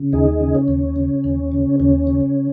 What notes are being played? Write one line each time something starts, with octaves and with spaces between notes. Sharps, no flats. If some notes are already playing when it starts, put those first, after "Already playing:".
Already playing: C#3
D#2 D#4 G#4
C#3
C#4
D#2
C#3
D#2
C#3
D#2 C#4
C#3